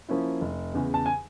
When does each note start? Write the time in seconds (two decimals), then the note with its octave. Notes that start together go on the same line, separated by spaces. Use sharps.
0.09 F3 A#3 C#4 E4
0.41 F1
0.74 E2 C#3
0.94 A5
1.06 G#5